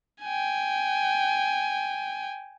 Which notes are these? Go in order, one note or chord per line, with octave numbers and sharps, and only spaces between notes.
G5 G#5